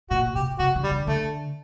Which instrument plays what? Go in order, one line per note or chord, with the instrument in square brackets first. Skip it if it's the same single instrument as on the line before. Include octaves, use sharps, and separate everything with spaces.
[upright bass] A#2 [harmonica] F#4
[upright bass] C3 [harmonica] G4
[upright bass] C3 [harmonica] F#4
[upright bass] D3
[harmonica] G3
[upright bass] D3
[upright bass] D3 [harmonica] A3